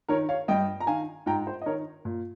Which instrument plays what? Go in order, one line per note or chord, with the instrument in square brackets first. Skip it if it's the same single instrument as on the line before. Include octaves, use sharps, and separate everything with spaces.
[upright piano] D#3 A#4 C#5
C#5 F5
G2 D#5 G5
A#5
D#3 F5 G#5
G#2 G5 A#5
C5
D#5
D#3 A#4 C#5
A#2